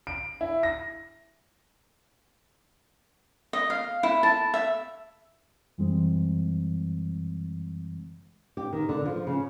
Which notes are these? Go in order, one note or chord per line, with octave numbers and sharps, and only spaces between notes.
D7
E4
A#6
D#5
F5
E4
A5
E5
F#2 E3 G3 G#3 C4
G4
D#3
D3
F3
C#3